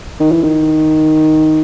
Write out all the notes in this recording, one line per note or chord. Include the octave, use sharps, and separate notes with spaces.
D#3
E3
D#3